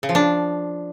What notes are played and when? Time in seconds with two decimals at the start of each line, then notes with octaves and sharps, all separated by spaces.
0.03 C#3
0.09 F3
0.15 D4